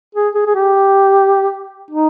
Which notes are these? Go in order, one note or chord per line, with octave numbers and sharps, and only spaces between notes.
G#4
G#4
G#4
G4
D#4